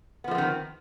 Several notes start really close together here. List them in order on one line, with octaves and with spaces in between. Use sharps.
B3 F3 A3 C4 D#3